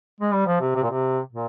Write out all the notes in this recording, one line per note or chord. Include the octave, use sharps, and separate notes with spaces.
G#3
G3
F3
C3
C3
A#2
C3
A#2